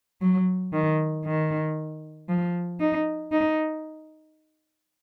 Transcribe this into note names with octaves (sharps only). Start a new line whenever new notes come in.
F#3
D#3
D#3
F3
D#4
D#4